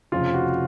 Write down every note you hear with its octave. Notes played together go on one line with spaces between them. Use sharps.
F1 F2 C#3 F4
F#4